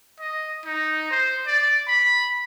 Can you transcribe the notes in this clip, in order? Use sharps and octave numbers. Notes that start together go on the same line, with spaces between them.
D#5
D#4
C5
D5
B5